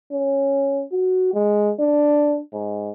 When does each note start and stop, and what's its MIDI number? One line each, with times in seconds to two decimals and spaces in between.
0.12 0.84 61
0.92 1.33 66
1.34 1.72 56
1.80 2.40 62
2.53 2.91 44